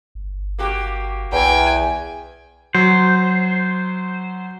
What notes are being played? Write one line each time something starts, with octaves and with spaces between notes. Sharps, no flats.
G1
A#3 F#4 G4
B1 E2 G5 G#5
F#3 C5